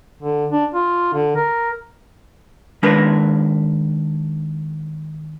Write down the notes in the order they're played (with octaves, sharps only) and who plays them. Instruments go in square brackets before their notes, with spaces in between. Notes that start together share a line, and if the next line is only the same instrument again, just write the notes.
[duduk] D3
D4
F4
D3
A#4
[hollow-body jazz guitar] D#3 G#3 D4 G#4 A#4 B4